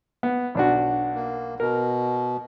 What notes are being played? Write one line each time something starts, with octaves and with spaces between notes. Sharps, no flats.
B3
B1 D4 F#4
A#3
B2 A#4